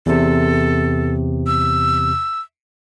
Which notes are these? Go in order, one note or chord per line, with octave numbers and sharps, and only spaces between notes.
E2 C3 A4
E6